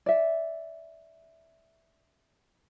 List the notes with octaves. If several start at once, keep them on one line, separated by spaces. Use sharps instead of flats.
D5 E5